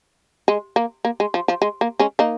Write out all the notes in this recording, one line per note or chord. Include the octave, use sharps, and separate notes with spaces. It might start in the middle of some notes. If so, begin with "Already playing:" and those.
G#3
A#3
A#3
G#3
F3
F3
G#3
A#3
G#3 C#4
A#3 D#4